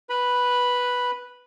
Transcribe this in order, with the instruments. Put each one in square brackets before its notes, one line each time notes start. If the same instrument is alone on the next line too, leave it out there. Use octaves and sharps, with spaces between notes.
[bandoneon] B4 B5